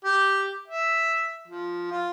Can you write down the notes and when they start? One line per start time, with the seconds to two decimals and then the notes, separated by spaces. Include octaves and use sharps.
0.04 G4
0.68 E5
1.48 F3
1.91 F4